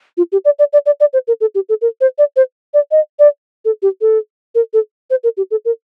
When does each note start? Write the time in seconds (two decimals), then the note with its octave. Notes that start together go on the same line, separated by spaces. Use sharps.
0.17 F4
0.32 G4
0.45 D5
0.59 D5
0.73 D5
0.86 D5
1.00 D5
1.13 C5
1.27 A#4
1.41 A4
1.55 G4
1.69 A4
1.81 A#4
2.01 C5
2.18 D5
2.36 C5
2.74 D5
2.91 D#5
3.19 D5
3.65 A4
3.82 G4
4.01 A4
4.55 A#4
4.73 A4
5.10 C5
5.24 A#4
5.37 G4
5.51 A4
5.65 A#4